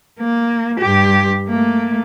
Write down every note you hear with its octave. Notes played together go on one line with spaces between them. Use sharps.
A#3
G2 G4
A3 A#3